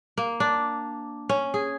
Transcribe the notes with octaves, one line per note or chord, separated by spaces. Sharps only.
A#3
D4
C#4
G#4